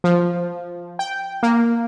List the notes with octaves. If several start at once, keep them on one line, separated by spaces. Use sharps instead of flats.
F3
G5
A#3